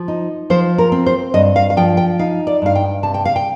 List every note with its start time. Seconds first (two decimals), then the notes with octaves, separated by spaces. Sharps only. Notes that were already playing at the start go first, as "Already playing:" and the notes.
Already playing: F3
0.08 D#4
0.50 F3 C5
0.78 A#4
0.92 C4
1.06 C5
1.34 G2 D#5
1.56 F5
1.70 F5
1.77 F3 G5
1.97 G5
2.19 D#4 F5
2.47 D5
2.62 G2 F5
2.75 G5
3.03 C3 A5
3.14 G5
3.25 F5
3.36 G5